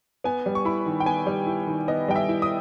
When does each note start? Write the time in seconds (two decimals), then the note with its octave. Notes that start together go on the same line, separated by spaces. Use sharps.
0.24 B3 G#5
0.46 G3
0.55 C#6
0.65 E4 B5
0.86 D#3
1.00 G5
1.06 B3 G#5
1.26 G3
1.47 E4
1.67 D#3
1.88 B3 D#5
2.08 G3 G5
2.16 E5
2.29 E4
2.42 D#6